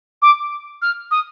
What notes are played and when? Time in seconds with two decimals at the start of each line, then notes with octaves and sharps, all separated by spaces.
0.22 D6
0.82 F6
1.11 D#6